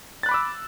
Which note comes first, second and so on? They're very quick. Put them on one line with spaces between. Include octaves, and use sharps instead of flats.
A6 F#6 B5 D6 E6